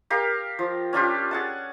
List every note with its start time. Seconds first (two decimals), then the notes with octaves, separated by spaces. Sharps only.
0.10 G4 A#4 F5
0.59 F3
0.93 C#4 D4 F4 G4
1.31 G#4 F#5 A5